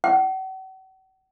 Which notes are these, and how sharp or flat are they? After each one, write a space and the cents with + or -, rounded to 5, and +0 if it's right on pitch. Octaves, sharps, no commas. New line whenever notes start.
F#5 +45